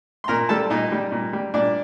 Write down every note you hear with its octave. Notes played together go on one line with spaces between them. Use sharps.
C6
A#2 A#4 A#5
G3 A4 A5
A#2 D#4 D#5
G3
A#2
G3
A#2 D4 D5